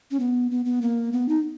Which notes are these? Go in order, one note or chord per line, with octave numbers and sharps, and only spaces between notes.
C#4
B3
B3
B3
A#3
B3
D#4